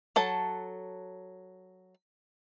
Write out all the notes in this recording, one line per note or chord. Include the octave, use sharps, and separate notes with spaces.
F#3 A4 A5